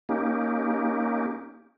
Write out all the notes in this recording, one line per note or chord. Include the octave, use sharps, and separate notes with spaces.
A#3 C#4 D#4 G4